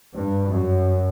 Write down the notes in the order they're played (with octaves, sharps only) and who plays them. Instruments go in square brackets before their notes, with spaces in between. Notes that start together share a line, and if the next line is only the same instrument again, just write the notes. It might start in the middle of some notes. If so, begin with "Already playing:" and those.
[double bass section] G2
F#2